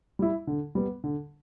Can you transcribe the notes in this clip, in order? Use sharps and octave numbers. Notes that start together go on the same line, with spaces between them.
G3 E4
D3
G3 B3
D3